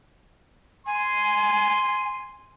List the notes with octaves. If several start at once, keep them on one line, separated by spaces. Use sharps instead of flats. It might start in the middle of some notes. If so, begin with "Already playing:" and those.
G#5 C6